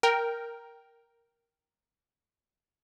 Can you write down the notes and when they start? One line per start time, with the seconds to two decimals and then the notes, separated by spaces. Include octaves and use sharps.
0.03 A#4 G5 A#5